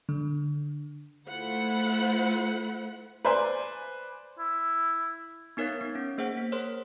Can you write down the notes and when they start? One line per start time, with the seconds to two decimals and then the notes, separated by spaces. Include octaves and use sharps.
0.09 D3
1.28 A3 E4 F4 C5 F#5 B5
3.25 B4 C5 D5 G#5 B5 C6
4.39 E4
5.57 B3 D#4 A#4 C#5 F5 A6
5.81 B3
5.95 C#4
6.18 A#3 G#4 C5 F#5
6.37 B6
6.52 A#4 C5 C#5 C6